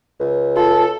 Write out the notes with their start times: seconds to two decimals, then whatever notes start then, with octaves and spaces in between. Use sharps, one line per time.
0.20 C#2
0.57 F4 A4